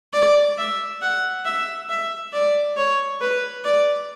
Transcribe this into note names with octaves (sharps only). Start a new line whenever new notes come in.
D5
E5
F#5
E5
E5
D5
C#5
B4
D5